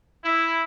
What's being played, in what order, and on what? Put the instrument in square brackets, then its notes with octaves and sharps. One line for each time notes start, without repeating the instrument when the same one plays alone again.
[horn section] E4